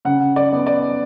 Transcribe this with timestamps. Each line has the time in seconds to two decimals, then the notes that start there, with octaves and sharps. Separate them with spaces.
0.05 C#3 F#5
0.36 D5
0.52 B3
0.67 D5